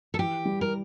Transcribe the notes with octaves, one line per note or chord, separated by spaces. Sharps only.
A4
E3 G4
G3
A#4